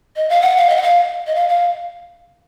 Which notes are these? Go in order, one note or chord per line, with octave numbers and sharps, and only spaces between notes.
D#5
F5
F#5
F5
D#5
F#5
F5
D#5
F5
F5